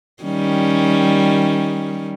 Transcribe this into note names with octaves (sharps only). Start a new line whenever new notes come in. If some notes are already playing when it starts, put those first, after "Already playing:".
D#3 G3 C#4